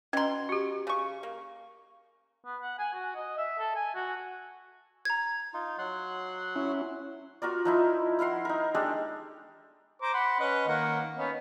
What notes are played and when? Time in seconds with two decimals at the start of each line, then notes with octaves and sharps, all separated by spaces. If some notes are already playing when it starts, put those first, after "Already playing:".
0.13 B2 C#4 A#5 C6
0.49 F#4 G4
0.87 C#3 C#6
1.23 A#3
2.45 B3
2.62 F#5
2.79 G#5
2.93 F#4
3.16 D#5
3.38 E5
3.59 A4
3.75 G#5
3.95 F#4
5.05 A#5 G#6
5.54 D#4 F4
5.78 F#3 F#5 C6
6.56 C#4 E4
7.42 F4 F#4 A#4 D5
7.65 F3 D#4 E4
8.19 E4 A#4 F#5 C6
8.45 D#4 A#4
8.75 G#3 D4 G4 A4
10.02 C5 A#5 D6
10.14 F#5 B5 C6
10.40 C#4 B4 D#5
10.68 D#3 A#3 F#5
11.17 B3 C#4 D#4